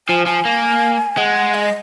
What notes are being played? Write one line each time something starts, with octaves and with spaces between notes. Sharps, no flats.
F3 G#5
F3 G#5
A#3
G#3 F#5
D#5